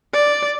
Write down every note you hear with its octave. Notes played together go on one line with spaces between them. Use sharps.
D5